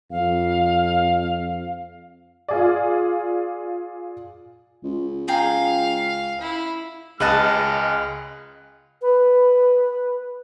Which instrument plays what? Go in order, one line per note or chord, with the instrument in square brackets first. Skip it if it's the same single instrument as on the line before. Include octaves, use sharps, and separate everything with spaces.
[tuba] F2 [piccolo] F5
[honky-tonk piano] F4 G#4 D5
[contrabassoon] C#2
[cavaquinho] G#4 G5 A#5 [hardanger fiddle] F5
[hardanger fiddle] E4
[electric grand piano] C#2 F#6 [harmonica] G#3 F6 [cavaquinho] B4 D#5 A5
[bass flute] B4